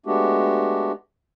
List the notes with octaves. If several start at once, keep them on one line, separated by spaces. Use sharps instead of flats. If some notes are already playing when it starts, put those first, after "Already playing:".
G#3 A3 B3 D4 F#4 G4